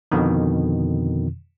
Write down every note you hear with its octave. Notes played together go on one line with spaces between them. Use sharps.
F2 B2 D3 D#3